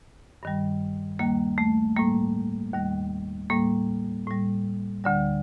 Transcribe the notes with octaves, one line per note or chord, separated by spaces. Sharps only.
G2 D#3 G3
D#2 D#3 G3 A#3
A3
A2 G3 A#3
D#2 D#3 G3
A2 G3 A#3
A2 G3
D2 D3 G3